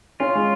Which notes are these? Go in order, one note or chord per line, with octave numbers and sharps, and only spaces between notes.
C#4 F4
G#3